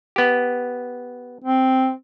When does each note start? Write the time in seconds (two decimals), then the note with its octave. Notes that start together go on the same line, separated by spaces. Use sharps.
0.16 B3 G4
1.44 C4